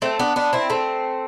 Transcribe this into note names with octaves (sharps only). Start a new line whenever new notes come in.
A3 C4
B3 D4
B3 D4
C4 E4
A3 C4